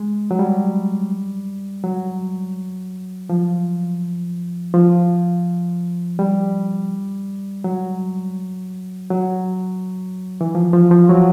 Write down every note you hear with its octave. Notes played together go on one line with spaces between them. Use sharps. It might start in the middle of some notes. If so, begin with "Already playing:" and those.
Already playing: G#3
F#3
G3
F#3
F3
F3
G3
F#3
F#3
E3
F3
F3
F3
F#3